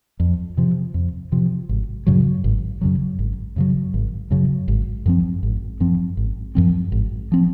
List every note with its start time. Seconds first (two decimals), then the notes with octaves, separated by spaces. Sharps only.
0.20 F2
0.57 C3 F3
0.94 F2
1.32 C3 F3
1.69 G#1
2.07 F#2 C#3 F#3
2.44 G#1
2.81 F#2 C#3 F#3
3.19 G#1
3.56 F#2 C#3 F#3
3.94 G#1
4.31 F#2 C#3 F#3
4.68 G#1
5.06 F#2 F3 C4
5.43 G#1
5.80 F#2 F3 C4
6.17 G#1
6.55 F#2 F3 C4
6.92 G#1
7.32 F3 C4